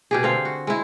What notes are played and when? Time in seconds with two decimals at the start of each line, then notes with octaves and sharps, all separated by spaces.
0.11 B2 G4 G#4
0.23 D3 C4 F5
0.45 F#4
0.67 G#3 E4